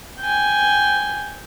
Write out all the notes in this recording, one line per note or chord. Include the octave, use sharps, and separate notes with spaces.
G5 G#5